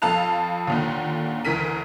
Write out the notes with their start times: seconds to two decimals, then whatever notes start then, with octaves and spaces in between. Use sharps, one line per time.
0.02 F2 A4 F5 A5 F#6 F7
0.67 D#2 A#2 D3
1.45 D2 E3 A#4 B6 D#7